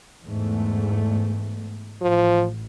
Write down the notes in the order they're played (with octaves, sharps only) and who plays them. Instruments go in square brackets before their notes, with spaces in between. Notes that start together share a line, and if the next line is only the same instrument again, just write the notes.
[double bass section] E2 G#2 A3
[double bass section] A1 [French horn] F3